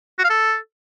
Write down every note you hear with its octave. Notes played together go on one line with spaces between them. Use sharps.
F#4
F5
A4